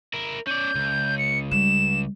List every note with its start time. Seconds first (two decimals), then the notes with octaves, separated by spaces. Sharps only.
0.13 E4 A#4
0.47 C#4 D5 G6
0.75 C#2
1.18 C#7
1.51 G3 E7